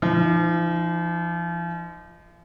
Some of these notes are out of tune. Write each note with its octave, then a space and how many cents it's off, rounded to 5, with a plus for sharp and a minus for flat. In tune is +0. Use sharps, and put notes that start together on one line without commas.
F3 -40 D#4 +0